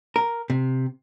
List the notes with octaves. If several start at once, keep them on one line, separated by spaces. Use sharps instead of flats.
A#4
C3